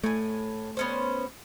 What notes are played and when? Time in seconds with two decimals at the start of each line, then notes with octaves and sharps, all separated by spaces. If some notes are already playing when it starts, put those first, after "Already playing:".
0.04 A2 A3 G#5
0.77 B3 C#4 C5